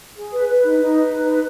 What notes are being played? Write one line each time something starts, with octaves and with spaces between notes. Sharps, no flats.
G#4
B4
B4
D#4
D#4
B4
D#4
B4